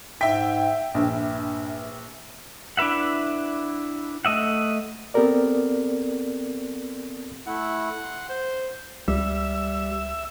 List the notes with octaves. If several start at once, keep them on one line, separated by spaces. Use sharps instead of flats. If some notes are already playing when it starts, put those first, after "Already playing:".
G#2 E5 G5 B6
A#1 G2
D4 E4 B4 E5 F#5
A3 D#5 E5 F#5
B3 C4 G4 A4 A#4 D5
A3 E4 F#5
C6
C5
C#2 G3 E5